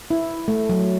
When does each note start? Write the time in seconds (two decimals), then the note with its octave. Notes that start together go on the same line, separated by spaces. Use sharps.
0.10 E4
0.48 A3
0.69 F#3